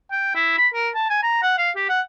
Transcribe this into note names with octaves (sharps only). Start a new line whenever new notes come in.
G5
E4
B5
A#4
A5
G#5
A#5
F#5
F5
G4
F#5